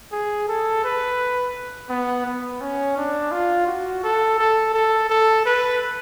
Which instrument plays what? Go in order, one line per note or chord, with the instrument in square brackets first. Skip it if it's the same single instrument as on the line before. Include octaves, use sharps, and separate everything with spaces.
[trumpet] G#4
A4
B4
B3
B3
C#4
D4
F4
F#4
A4
A4
A4
A4
B4